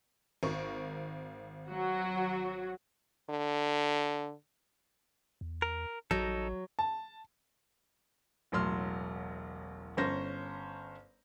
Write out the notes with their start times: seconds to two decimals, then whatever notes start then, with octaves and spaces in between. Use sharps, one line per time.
0.43 G#1 A#4 C#6
1.68 F#3 F#4
3.30 D3
5.41 E2
5.62 A#4
6.11 A1 F#3 D#4 A4
6.79 A5
8.52 E1 A1 F#3 C6 F6
9.97 G1 C#4 C5 A#6